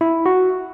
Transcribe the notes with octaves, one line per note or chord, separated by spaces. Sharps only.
E4
F#4